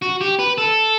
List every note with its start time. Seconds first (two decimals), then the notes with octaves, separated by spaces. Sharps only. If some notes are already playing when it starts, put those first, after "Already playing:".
0.02 F#4
0.21 G4
0.39 B4
0.58 A4